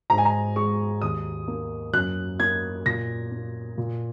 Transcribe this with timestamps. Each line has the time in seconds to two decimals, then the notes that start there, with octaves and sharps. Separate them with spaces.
0.10 G#2 A#5
0.18 G#5
0.25 A#5
0.56 G#3 C#6
1.01 D#2 D#6
1.48 A#3
1.93 F#2 F#6
2.39 A#3 G#6
2.86 A#2 A#6
3.31 A#3
3.78 A#2